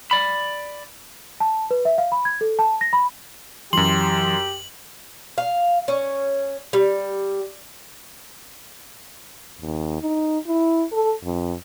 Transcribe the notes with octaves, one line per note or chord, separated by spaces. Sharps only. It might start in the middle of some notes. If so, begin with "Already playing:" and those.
D5 B5
A5
B4
E5
F5
B5
G#6
A4
A5
A#6
B5
F#2 E3 F#3 G4 C6 F#7
F5
C#4
G3
D#2
D#4
E4
A4
F2